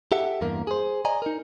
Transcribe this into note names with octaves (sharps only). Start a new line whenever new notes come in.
G4 A4 E5 F#5
E2 G2 A#3 A#4
G#4 C5
D5 D#5 G#5 A#5
D#4 A#4